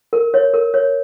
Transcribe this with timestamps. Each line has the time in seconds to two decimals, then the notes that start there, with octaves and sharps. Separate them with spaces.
0.13 A#4
0.34 C#5
0.54 A#4
0.74 C#5